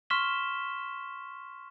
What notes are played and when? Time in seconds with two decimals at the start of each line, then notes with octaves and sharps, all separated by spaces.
0.10 C6 C#6 F6 B6 E7 G7